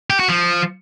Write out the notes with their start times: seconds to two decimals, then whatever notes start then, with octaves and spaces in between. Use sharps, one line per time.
0.10 G4
0.20 F#4
0.29 F3